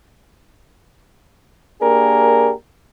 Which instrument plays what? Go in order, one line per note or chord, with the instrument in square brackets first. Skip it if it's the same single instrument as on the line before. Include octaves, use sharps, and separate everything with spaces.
[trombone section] A#3 D4 G4 G#4 A#4